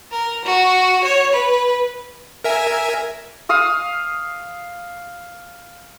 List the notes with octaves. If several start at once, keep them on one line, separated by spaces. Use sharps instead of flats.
A#4
F#4
C#5
B4
A#4 E5 G#5
F5 D#6 E6